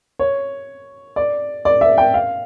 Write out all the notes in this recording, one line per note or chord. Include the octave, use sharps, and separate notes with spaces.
C#5
D5
D5
E5
G5
F5